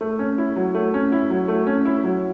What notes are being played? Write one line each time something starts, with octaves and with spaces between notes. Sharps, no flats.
A3
C#4
E4
F#3
A3
C#4
E4
F#3
A3
C#4
E4
F#3